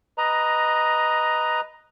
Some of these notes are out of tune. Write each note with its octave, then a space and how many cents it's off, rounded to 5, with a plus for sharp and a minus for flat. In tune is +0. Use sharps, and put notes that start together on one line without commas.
B4 +0 D#5 +0 A#5 +10